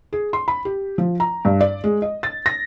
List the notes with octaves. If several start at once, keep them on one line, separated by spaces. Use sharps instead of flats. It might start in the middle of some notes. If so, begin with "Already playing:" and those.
G#4
C6
B5
G4
F3
A#5
G2
D5
G#3
D#5
A6
A#6